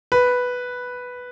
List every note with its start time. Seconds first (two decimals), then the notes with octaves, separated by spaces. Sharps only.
0.12 B4